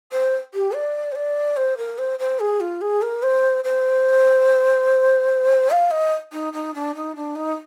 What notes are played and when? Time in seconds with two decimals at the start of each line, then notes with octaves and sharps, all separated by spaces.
0.12 C5
0.54 G4
0.74 D5
1.11 C5
1.15 D5
1.56 C5
1.77 A#4
1.98 C5
2.19 C5
2.39 G#4
2.60 F4
2.81 G#4
3.02 A#4
3.22 C5
3.64 C5
5.70 F5
5.90 D#5
6.32 D#4
6.53 D#4
6.74 D4
6.95 D#4
7.15 D4
7.35 D#4